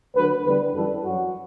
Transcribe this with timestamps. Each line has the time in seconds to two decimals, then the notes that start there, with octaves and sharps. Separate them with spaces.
0.15 D2 D3 F#3 B4
0.44 E2 D3 G3 B4
0.74 F#2 E3 G3 A4
1.03 F#2 F#3 F#4